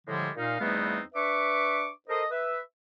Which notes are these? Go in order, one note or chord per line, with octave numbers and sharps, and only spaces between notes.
A2 D3 F3 G3 G#3
A#2 D#4 F5
E2 G3 A3 B3 C4 D#4
D4 B4 E5 C#6 D6
A4 A#4 C5 D#5
B4 E5